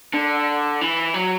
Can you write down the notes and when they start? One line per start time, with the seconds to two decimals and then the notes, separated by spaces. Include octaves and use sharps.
0.14 D3
0.81 E3
1.14 F#3